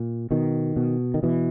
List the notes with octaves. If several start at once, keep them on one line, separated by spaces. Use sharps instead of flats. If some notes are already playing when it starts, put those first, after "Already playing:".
Already playing: A#2
B2 D#3
B2
D#3
B2 E3